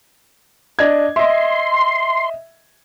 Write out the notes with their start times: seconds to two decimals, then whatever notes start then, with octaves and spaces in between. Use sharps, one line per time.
0.79 D4 D#5 G#6
1.16 D#5 E5 C6